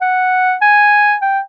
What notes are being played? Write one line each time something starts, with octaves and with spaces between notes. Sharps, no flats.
F#5
G#5
G5